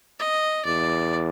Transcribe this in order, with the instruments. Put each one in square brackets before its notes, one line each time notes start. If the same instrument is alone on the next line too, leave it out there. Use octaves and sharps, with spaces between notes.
[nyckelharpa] D#5
[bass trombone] E2 [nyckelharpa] D5